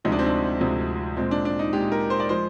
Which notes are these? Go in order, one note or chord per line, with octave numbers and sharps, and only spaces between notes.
D2 C3 F3 G#3 D#4
D4
C4
D4
D2 C3 F3 G#3
A#2 G#3 C4
D4
D4
D#4
A#2 G#3 G4
A#4
C5
D5
F3 G#3 C5